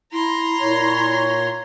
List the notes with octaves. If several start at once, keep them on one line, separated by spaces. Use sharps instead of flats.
E4 A#5 C6
A#2 C#5